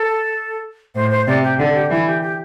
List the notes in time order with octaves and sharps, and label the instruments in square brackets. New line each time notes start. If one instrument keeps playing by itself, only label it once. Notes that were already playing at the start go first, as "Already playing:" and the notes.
Already playing: [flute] A4
[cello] A2 [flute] C5
[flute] C5
[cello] C3 [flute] D5
[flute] G4
[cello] D3 [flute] A4
[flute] G4
[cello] E3 [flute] E4
[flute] G4
G4